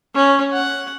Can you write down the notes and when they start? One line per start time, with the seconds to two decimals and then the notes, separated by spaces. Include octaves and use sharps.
0.15 C#4
0.53 F#5